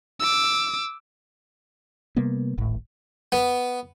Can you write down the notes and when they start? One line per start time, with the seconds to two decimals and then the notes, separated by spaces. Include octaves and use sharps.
0.20 D6 E6
2.16 C3 G3 A#3 B3
2.58 D1 G#1 A2
3.32 B3